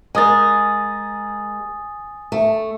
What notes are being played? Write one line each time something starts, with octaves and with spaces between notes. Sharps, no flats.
G#3 A#4 G#5 D#6 A6
A3